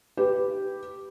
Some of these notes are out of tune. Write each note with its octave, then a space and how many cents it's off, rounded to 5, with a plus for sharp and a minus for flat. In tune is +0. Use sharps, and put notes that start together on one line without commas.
G4 +0 B4 +10